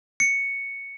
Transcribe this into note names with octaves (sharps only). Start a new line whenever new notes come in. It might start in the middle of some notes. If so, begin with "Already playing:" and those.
C#7